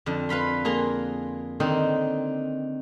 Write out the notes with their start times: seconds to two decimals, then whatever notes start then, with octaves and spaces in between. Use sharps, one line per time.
0.06 F2 D3
0.29 B4 F5 B5 C6
0.65 A#3 G#4 A#5 C6
1.60 D3 D#3 C4 D#4